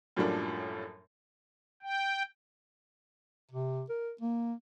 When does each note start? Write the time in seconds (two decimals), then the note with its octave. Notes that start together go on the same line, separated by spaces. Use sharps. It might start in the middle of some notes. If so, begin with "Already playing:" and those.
0.16 F#2 A2 F3 G3 A#3 D4
1.82 G5
3.51 C3
3.89 A#4
4.21 A#3